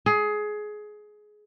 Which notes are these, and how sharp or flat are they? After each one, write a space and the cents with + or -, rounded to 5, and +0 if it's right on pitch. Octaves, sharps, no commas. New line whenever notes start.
G#4 +20